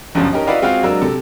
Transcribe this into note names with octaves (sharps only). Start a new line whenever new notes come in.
G1 C#2 F#2 C#3 F3
C#4 D#4 G4 A#4
E4 F#4 B4 D5 D#5 F5
G#3 C4 F4 F#4 G#4 F5
F#3 G#3 D4 A#4 E6
C3 A4